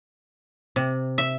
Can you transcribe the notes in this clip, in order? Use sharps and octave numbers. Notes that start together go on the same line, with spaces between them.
C3
E5